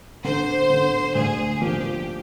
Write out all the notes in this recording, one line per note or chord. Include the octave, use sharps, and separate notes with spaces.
D3 C5
D3
D2 G#4
F3 G4